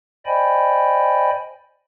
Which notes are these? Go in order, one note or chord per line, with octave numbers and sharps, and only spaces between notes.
C5 D5 D#5 G5 G#5 B5